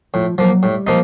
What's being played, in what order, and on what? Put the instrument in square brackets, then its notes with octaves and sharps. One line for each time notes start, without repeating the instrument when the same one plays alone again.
[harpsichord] A2 [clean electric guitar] F3
[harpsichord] F3 A#3 [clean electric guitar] F#3
[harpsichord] A2 [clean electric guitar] G3
[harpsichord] F3 A#3 D#4